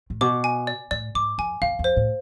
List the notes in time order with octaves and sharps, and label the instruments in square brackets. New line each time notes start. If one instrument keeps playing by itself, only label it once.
[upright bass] A2
[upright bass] B2 [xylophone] D6
[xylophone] G#5
D5
[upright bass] A2 [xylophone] D5
[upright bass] G#2 [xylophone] D6
[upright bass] F2 [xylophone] G#5
[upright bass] E2 [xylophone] F5
[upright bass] F2
[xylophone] C5
[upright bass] A2